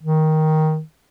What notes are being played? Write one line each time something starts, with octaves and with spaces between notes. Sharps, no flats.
D#3